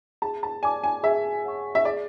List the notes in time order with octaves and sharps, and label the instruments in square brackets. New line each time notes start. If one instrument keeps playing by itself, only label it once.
[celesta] G#4 [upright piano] A5
[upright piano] A5
[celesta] D5 A5 D6 [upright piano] G#5
[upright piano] G#5
[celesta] G#4 [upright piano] E5
[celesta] C#5 F#5 C#6
[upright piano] E5
[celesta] G#4 [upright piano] D5